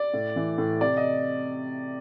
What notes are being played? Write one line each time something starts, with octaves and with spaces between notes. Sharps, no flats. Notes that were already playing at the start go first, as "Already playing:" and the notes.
Already playing: D5
A2
E3
A2
C3 D5
D#5